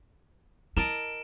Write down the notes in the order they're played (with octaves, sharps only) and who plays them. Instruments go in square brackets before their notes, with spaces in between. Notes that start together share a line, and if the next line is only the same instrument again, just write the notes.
[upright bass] E4 [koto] A#4 D#5 A5 [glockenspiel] D7 E7